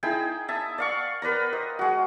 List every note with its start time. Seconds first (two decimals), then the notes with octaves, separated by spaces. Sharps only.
0.03 D#4 E4 G#4 G5
0.48 E5 A5 D#6
0.78 D5 F5 C#6
1.22 A#4 B4 D5 A#5
1.53 C5 D#5
1.79 G#3 F#4